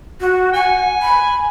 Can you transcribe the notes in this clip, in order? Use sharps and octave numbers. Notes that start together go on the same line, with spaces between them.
F#4
F#5 G#5
B5